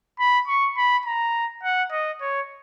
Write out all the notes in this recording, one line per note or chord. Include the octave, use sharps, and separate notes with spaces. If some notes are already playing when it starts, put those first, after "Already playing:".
B5
C#6
B5
A#5
F#5
D#5
C#5